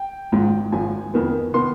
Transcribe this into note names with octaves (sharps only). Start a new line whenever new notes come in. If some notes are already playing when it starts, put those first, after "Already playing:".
Already playing: G5
G#1 G#2 F3
G#1 G#2 F3 G#5
F2 D#3 B3
D#3 B3 C6